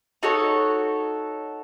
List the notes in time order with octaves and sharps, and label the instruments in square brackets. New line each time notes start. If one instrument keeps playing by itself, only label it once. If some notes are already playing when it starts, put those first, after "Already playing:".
[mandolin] D#4 F#4 A4 C#5